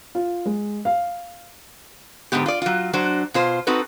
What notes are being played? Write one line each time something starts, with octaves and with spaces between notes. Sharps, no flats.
F4
G#3
F5
G#2 D3 F3 B3 G4
F4 D5
F#3 F4
F#3 D4 F#4 C5
B2 F4 C5
C4 D#4 F#4 A4 B4